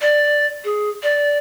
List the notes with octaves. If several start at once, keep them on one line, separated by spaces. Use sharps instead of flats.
D5
G#4
D5